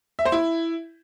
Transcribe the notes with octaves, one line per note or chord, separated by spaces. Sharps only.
E5
C5
E4